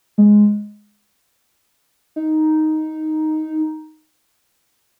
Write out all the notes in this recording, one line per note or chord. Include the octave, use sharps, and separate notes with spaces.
G#3
D#4